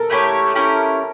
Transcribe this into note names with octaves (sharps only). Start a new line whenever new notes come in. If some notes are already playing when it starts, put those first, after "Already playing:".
Already playing: A4 A#4
A3 E4 G4 C#5
C#4 E4 G4 A#4